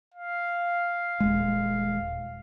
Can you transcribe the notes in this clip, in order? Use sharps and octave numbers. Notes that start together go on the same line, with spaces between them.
F5
D#1 G#3